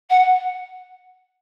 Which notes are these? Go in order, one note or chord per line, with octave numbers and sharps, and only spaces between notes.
F#5